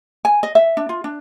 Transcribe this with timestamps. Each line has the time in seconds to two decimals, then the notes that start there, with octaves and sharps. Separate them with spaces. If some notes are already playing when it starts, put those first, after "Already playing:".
0.25 G#5
0.43 D#5
0.55 E5
0.77 D4
0.89 F4
1.04 D4